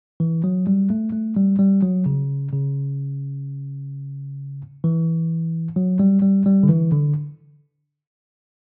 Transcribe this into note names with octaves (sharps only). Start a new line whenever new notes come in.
E3
F#3
G3
A3
A3
G3
G3
F#3
C#3
C#3
E3
F#3
G3
G3
G3
D3
E3
D3